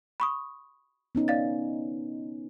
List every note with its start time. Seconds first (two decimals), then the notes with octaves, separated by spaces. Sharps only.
0.20 B5 C#6 D#6
1.15 B3 C#4 D#4
1.28 D5 F5 A6